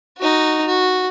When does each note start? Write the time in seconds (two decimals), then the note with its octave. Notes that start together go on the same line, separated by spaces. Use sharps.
0.18 D#4 F#4
0.67 F#4